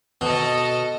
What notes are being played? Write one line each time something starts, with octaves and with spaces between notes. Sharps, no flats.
B2 A4 D#5